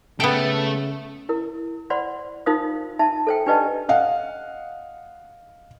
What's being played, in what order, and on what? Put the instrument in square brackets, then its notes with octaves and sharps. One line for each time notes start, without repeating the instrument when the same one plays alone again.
[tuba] C#3 [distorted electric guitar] A3 [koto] B3 G5
[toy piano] E4 A#4
C5 D5 F#5 B5 C6
D#4 F4 A#4 C5 F5 D#6
D#4 E5 A5
A4 C5 G5
D4 G4 B4 D5 D#5 A5
[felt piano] D#5 F5 F#5